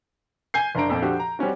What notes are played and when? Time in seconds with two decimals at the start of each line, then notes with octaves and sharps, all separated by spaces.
0.54 G#5 G6 C7
0.75 F#1 D4 A#5 D7
0.89 F2 A#2
1.02 D3 F3 F#4 G4
1.19 A#5
1.39 G3 C4 C#4 F#4